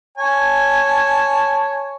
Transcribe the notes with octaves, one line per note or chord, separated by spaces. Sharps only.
C#5 G#5 A5